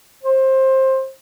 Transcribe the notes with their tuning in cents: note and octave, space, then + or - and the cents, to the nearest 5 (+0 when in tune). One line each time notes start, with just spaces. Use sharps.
C5 +20